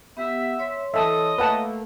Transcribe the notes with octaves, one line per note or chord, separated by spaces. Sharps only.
B3 G4 E5 F#5
C#5 C6
E3 A4 D#5 E5 A5
A3 A#3 B4 F#5 A5